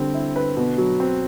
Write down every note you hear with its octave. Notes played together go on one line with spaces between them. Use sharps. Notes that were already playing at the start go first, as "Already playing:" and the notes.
Already playing: D3 G3 C4
E4
B4
B2
F#3
C4